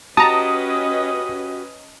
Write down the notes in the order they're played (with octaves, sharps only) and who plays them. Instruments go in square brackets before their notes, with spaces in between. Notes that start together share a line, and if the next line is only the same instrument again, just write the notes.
[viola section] C#4 B4 D#5 [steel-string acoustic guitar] F#4 G4 [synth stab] A5 A#5 [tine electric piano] D#6